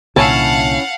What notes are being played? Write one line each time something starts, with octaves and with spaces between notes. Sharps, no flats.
C2 A#2 D3 C#4 E4 F5 F#5 A5